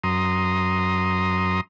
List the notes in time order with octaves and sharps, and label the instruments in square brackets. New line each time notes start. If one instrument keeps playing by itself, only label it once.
[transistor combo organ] F#2 A#5 C6 D#6